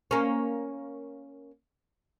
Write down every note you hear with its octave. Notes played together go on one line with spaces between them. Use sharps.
A#3 C#4